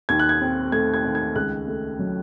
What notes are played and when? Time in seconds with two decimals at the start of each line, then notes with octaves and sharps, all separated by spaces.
0.09 D#2 G#6
0.19 F#6
0.29 G#6
0.41 C4
0.72 A3 G#6
0.94 G#6
1.04 D#3
1.15 G#6
1.35 C#2 F#6
1.68 A3
1.99 F#3